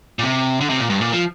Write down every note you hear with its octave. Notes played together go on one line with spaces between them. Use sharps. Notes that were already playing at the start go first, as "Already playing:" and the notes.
A#2
C3
D3
C3
A#2
G2
A#2
F3